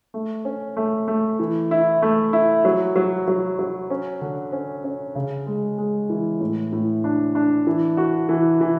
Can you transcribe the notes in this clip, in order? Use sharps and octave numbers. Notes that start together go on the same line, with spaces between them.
A3
C#4
A3
A3
E3
E4
A3
E4
F#3
F#3
F#3
F#3
C#4
D3
C#4
C#4
C#3
G#3
G#3
E3
A2
A2
D4
D4
E3
F#4
E3
E3